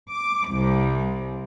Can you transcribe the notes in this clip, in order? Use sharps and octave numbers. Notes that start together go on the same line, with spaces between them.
D6
C2